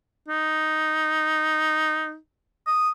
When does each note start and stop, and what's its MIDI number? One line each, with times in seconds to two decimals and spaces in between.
0.28 2.16 63
2.67 2.90 87